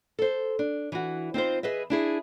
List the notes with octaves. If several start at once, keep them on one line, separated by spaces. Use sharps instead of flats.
A4 C5
D4
E3 F#4
C4 D#4 F4 C5
G#4 B4 D#5 E5
D4 E4 G#4